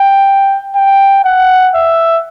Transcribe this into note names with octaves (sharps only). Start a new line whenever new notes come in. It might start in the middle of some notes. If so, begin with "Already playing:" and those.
Already playing: G5
G5
F#5
E5